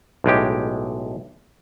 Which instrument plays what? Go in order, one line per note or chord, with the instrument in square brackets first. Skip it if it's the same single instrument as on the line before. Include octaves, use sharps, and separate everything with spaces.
[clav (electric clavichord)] B1 A2 G#3 G4